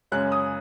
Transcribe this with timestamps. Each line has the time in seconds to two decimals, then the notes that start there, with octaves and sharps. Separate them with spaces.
0.12 F#2 C#3 G#3 C#4 F#6
0.32 D#6